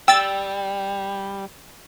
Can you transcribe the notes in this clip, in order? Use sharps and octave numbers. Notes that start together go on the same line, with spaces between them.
G3 G5 E6 A6